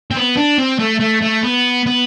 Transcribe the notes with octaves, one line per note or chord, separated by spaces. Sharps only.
C4
B3
D4
C4
A3
A3
A3
B3
B3